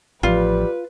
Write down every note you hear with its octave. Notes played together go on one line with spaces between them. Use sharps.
A1 F3 G3 F4 B4